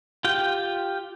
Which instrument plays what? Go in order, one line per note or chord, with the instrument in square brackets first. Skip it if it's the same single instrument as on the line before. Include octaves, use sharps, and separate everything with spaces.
[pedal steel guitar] F4 G4 G5